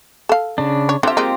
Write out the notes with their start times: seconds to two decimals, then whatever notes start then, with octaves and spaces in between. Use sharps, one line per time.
0.29 A4 F5
0.58 C#3 D4
0.89 C#5
1.03 D3 C4 F4 G4 E5
1.17 G#3 A#3 D#4